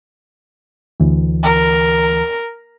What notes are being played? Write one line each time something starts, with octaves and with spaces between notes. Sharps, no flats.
D2 E3
A#4